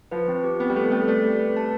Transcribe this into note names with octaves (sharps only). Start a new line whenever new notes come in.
F3 B4
C4
G4
B3 C4
G3
A3 B4
A3 C4
A3 D5
G4
B4
A5